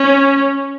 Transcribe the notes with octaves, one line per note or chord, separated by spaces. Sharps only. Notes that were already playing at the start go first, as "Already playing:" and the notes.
Already playing: C#4